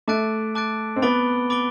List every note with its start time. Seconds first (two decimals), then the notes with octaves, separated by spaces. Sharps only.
0.08 A3 A5 D6 F#6 A6 D7
0.55 A5 D6 F#6 A6 D7
0.96 C4
1.02 B3 B5 D6 A6 D7 G7
1.50 B5 D6 A6 D7 G7